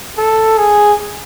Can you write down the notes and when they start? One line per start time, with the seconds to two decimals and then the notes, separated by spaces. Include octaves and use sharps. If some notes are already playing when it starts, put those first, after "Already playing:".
0.18 A4
0.58 G#4